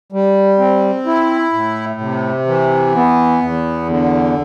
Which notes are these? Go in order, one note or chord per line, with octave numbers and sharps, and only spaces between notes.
G3
C4
E4
A2
C3
E3
B3
E2
D3